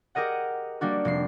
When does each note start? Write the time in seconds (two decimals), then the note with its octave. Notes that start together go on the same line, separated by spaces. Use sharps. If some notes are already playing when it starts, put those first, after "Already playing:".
0.15 G4 G#4 A#4 D#5 F#5
0.81 G3 A#3 D4 F#4
1.05 F1 C7